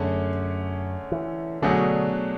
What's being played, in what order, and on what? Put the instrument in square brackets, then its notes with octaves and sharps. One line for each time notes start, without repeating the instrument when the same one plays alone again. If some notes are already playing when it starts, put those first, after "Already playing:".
Already playing: [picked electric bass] F#2 [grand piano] D3 A3 C#4 G#4
[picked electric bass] E3
[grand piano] B2 F#3 A3 D4 G#4 [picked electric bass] D3